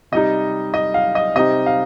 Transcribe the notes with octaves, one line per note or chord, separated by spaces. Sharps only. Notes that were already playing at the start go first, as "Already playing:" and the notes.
C3 G3 D#4 D#5
D#5
F5
D#5
C3 G3 C4 D#4 D#5
F5